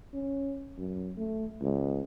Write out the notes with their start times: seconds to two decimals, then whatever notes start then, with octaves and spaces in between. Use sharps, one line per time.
0.13 C#4
0.78 F#2
1.17 A3
1.61 C#2